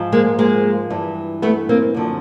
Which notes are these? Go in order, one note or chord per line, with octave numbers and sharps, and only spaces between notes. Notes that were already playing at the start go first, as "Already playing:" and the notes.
Already playing: G#2 F3
G#3 A#3
G#3 A#3
G2 E3
A3 B3
A#3 C4
F#2 D3 F3